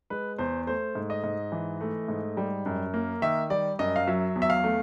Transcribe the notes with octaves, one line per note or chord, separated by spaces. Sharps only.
G#3 B4
E2 C5
A3 C5
G#2
D#5
G#2
E3
A3
G#2
G3
F#2
A#3
D#3 E5
G3 D5
F#2 D#5
F5
F#3 E5
E2
E5
F5
A3